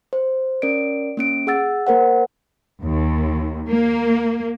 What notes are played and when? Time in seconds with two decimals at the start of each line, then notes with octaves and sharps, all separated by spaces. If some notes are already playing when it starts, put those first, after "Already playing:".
0.13 C5
0.62 C#4 A#4 D5 D7
1.17 A#3 C#4 D7
1.47 G#4 F#5 E6 A6
1.87 A#3 A#4 C5 F#5
2.81 D#2
3.70 A#3